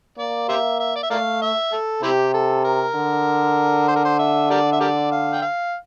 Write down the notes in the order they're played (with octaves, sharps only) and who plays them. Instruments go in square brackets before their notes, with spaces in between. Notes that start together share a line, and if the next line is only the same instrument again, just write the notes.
[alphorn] A#3 [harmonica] D5
[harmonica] G4 C5 E5
E5
D5
E5
[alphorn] A3 [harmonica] A#4 D5 F5
[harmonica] E5
A4
[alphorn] C3 [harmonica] C4 E4 G4
[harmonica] A4
A#4
[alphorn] D3
[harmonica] C5
A#4
C5
E5
G4 A#4 D5
E5
G4 A#4 D5
F5
G5
F5